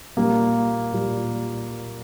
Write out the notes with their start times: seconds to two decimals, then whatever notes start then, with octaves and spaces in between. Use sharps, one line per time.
0.17 A#2 G3 A#3
0.93 A#2 G3